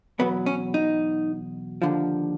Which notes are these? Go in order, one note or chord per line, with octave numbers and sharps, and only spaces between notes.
E2 B2 F#3 B3
C#4
D#4
D#2 D3 F3